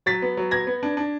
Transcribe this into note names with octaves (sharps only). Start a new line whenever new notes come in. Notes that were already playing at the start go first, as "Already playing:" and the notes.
F#3 A6 B6
B3
F#3
B3 G#6 A#6
B3
D4
D4